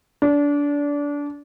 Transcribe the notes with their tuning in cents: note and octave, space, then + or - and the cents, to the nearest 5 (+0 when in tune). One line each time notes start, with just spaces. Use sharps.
D4 -25